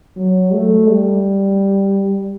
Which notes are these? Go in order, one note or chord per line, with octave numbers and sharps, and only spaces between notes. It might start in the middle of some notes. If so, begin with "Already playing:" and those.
F#3
A3
G3